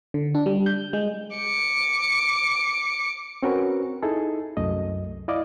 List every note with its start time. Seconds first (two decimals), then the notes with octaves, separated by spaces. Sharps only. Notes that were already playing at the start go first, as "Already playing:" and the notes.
0.14 D3
0.35 D4
0.46 G3
0.66 G6
0.93 G#3
1.35 D6 C#7
3.43 C4 C#4 F#4 A#4 B4
4.03 D#4 E4 G#4 A4
4.57 C2 F#2 A3 D#5
5.28 E4 D5 D#5 F5 D6